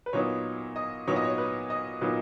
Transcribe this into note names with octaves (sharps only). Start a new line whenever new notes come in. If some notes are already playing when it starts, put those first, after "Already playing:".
B4
A#2 F#3 B3 D#4 C#5
D#5
A#2 F#3 B3 D#4 C#5
D#5
C#5
B4
D#5
A#2 F#3 B3 D#4 B4